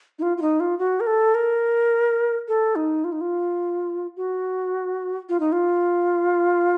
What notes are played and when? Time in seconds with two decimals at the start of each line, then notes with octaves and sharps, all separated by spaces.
0.19 D#4
0.22 F4
0.37 F4
0.42 D#4
0.60 F4
0.79 F#4
1.00 A#4
1.07 A4
1.35 A#4
2.48 A4
2.76 D#4
3.04 F4
3.12 D#4
3.21 F4
4.17 F#4
5.29 F4
5.40 D#4
5.52 F4